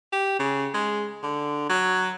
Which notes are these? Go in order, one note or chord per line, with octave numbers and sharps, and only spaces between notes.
G4
C#3
G#3
D3
F#3